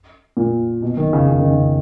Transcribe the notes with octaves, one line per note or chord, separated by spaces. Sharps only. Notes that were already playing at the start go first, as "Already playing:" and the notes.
A#2
B2
D#3
C#3
C#3
D#3
C#3